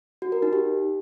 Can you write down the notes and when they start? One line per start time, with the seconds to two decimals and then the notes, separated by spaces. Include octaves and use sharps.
0.22 F#4
0.32 A#4
0.42 D#4
0.53 G4